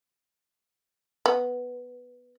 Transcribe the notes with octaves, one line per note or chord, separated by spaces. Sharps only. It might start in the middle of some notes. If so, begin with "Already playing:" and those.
B3